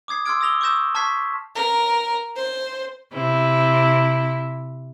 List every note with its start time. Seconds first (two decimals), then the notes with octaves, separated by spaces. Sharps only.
0.08 D6 D#6 G#6 C7
0.26 C6 D6 E6 F6 G#6 D7
0.41 D#6 E6 A#6 F7 G7
0.61 C#6 D#6 E6 G6 A#6 E7
0.95 A5 C#6 F6 G#6 B6 C7
1.56 A#4
2.36 C5
3.12 C3 C4 E4